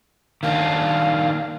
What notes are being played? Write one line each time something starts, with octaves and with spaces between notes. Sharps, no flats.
D#3 A#3 D4 F5